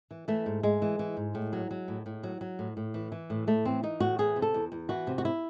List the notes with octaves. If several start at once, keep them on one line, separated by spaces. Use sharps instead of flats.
E3
E3 A3
G#2
G#2 G#3
E3
E3
G#2
A2
F#3
F#3
A2
A2
F#3
F#3
A2
A2
E3
E3
A2
A2 A3
E3 C4
E3 D#4
A2 F#4
E3 G#4
C3
A4
E2
E2
E3 F#4
C3
F#4
E4